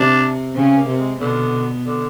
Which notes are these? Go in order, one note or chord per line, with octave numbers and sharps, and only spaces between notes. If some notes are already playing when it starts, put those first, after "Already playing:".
Already playing: C3 C4 D4
C#3 C4 C#4
A#3
C3 C4
G#3
B2 D3 B3
D3